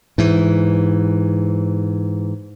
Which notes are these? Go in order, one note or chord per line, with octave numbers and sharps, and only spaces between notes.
G#2 E3